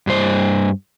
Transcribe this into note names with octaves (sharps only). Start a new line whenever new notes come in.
G2 C5